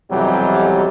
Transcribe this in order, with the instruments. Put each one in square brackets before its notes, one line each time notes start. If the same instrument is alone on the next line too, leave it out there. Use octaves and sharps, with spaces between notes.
[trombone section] B1 F2 C3 E3 F#3 G3